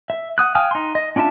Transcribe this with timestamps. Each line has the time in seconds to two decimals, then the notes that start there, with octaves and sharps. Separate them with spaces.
0.10 E5
0.38 F#5 D#6 F#6
0.55 F5 G5 G#5 D#6 F6
0.71 D#4 C6
0.95 D#5
1.16 C#4 D4 F4 E5 A5